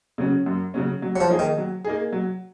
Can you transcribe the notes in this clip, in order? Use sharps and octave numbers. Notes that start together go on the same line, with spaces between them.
C#3 F#3 C#4
F#2
C#3 F#3 C#4
F#3
F#3
F3
A#3 D#4 G#4
D#3
F#3
A#3 D#4 G#4
F#3